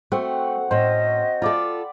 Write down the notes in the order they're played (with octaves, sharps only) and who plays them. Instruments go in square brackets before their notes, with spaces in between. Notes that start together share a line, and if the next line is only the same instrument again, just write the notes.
[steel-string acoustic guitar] A3 [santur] C4 F#4 F#5
[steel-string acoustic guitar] A2 C#4 [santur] C5 [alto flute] D#5
[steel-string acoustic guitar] F4 A4 [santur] D5 B5